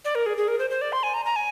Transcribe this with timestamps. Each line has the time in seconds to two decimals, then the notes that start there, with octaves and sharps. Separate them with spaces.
0.05 D5
0.15 A#4
0.26 G#4
0.37 G#4
0.48 A#4
0.59 C5
0.70 C5
0.81 D5
0.93 C6
1.03 G#5
1.14 A#5
1.25 A#5
1.36 G#5